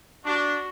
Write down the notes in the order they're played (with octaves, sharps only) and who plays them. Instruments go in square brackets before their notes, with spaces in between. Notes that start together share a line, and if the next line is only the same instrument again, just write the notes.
[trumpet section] D4 [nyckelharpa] F#4